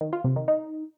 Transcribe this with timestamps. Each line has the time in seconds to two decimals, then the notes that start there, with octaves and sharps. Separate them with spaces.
0.01 D#3
0.13 F4
0.24 C3
0.36 D#3
0.48 D#4